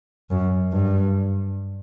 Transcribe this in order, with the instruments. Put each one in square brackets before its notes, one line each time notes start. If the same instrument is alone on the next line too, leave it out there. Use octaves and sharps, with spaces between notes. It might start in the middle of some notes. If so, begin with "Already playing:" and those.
[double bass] F#2
G2